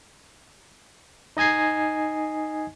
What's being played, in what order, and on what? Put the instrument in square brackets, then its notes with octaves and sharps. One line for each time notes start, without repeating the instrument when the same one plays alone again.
[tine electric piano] D#4 D#5 G#5 G#6 C7